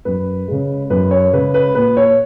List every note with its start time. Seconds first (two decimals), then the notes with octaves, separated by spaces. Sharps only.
0.05 F#2 B4
0.48 C#3 G#3
0.90 F#2 B4
1.11 C#5
1.33 C#3 G#3 B4
1.54 B4
1.75 A#2 B4
1.97 C#5